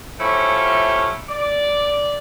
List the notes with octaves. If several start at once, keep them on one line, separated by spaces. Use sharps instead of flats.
F3 A3 C#4 E4 F4 G4
D5